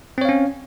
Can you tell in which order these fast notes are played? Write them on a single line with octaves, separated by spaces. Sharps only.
C4 C#5 F5 C#4